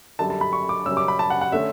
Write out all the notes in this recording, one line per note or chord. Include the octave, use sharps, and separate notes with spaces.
F#2 D3 G3 A5
A5
B5
C#6
D6
F#2 C#3 G3 C#4 E6
D6
B5
A5
F#5
F#5
D3 A3 C#4 E5